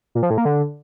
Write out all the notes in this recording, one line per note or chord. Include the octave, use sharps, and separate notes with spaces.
A#2
F3
A2
A#3
D3